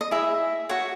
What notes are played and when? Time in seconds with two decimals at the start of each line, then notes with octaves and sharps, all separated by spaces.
0.01 D#5
0.11 E4 G#4 D#5 E5
0.69 F#4 C#5 F#5